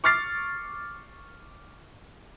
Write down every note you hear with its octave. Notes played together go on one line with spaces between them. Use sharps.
C#6 D6 F6 A6 C7